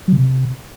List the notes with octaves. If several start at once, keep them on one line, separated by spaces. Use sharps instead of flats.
F#3
C#3
C3